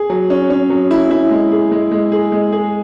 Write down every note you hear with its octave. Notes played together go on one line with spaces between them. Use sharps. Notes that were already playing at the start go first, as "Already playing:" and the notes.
Already playing: G#4
F#3
C#4
C#4
F#3
E4
E4
G#3
G#4
G#3
G#3
G#4
G#3
G#4